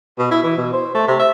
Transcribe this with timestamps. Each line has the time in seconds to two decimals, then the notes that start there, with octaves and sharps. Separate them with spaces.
0.18 B2
0.31 E4
0.43 E3
0.57 B2
0.73 C5
0.94 A3
1.07 C3
1.19 E5